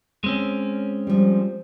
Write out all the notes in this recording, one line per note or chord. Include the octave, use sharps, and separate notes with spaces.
G#3 C4 C#4
F3 G3